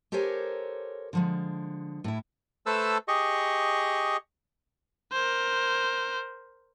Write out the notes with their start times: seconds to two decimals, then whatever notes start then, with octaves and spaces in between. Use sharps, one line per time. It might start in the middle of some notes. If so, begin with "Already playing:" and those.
0.12 G4 A4 A#4 C5 C#5 G#5
1.13 D3 F3 G#3
2.04 A2 E4
2.66 A3 A4 B4 C5 A5 E6
3.08 G4 G#4 D#5 C#6
5.12 A#4 C5